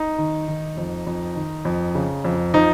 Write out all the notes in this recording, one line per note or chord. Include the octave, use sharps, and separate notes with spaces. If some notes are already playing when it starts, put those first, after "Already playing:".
Already playing: D#4
D#3
D#3
F2
F2
D#3
F2
C#3
F2
F3 D#4